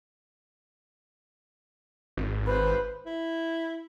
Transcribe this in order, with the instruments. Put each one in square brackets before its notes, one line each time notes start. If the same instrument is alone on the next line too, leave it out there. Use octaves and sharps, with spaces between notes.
[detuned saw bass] G#1
[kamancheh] B4 C5
[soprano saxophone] E4